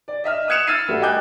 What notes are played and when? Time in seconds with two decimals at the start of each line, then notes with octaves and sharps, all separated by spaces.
0.08 D5
0.24 D#5 E5 F6
0.48 D#6 F#6 G#6 C#7 E7 F7
0.67 E6 F6 G#6 A6 C7 D#7
0.88 G3 A3 F#4
1.01 D#5 G5 G#5 D6 F#6 G6